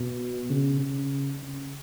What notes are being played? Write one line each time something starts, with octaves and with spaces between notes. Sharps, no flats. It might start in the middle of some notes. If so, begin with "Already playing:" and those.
Already playing: B2
C#3
C#3
C#3